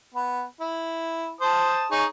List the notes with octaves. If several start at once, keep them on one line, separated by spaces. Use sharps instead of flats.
B3
E4
C5 A5 D#6
D#4 G#4 C#5